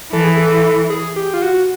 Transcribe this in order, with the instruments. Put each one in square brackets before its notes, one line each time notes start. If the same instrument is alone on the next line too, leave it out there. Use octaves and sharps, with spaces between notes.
[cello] E3 [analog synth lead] A4
[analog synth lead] G#4
A4
G#4
G4
F4
F#4